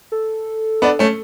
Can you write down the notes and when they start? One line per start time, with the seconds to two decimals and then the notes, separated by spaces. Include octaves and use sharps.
0.12 A4
0.82 B3 D4
0.99 A3 C#4